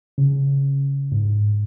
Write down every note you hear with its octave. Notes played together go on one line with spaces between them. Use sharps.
C#3
G#2